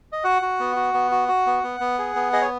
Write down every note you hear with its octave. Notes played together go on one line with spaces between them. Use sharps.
D#5
F#4 F#5
F#4
B3
F#4
B3
F#4
F#4
B3
B3
B3
G#4
B3
G#4 D#5
C#5